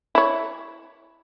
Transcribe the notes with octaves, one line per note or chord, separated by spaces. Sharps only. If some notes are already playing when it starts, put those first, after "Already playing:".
E4 C#5